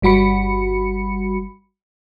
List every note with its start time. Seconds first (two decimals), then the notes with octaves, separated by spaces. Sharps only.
0.02 G1 G3 F#4 B5 C#7